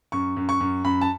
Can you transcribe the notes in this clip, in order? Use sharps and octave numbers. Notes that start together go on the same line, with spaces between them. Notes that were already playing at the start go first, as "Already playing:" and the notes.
F#2 C#6
F#2
C#6
F#2
F#2 B5
A5